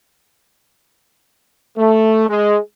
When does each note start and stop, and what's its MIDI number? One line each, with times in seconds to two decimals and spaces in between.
1.77 2.26 57
2.29 2.58 56